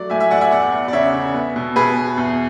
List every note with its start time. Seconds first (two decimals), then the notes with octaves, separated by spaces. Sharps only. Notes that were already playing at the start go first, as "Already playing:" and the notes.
Already playing: F#3 A3 D5
0.10 A2 E5 G#5
0.20 E5 G#5
0.31 A2 D5 F#5
0.41 E5 G#5
0.51 E2 D5 F#5
0.72 E2
0.88 D5
0.93 C#3 C#5 E5
1.14 C#3
1.34 B3
1.56 B2
1.76 B2 G#4 B4
1.97 B2
2.17 E2